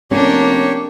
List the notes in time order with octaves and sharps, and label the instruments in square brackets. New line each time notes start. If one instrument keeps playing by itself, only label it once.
[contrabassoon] F1 [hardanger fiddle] A#3 D4 [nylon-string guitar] C#4 [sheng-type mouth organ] G4 C#5